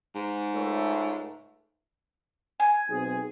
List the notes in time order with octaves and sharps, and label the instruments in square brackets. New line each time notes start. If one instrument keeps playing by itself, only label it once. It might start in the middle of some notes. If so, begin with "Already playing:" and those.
[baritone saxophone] G#2
[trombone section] C#2 A3
[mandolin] G#5
[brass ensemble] B1 C4 G#4